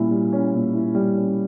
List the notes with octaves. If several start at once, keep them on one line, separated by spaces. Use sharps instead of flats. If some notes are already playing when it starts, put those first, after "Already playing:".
Already playing: A#2 G3 C#4 E4
G3
C#4
A#2
E4
G3
C#4